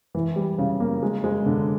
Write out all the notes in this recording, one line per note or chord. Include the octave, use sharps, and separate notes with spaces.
E3
G3
C#3
A#3
G#3
G#3
D3